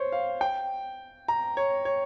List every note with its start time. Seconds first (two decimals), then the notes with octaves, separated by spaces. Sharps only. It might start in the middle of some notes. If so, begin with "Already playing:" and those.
Already playing: C5 C#5
0.12 F5
0.41 G5
1.28 A#5
1.57 C#5
1.85 C#5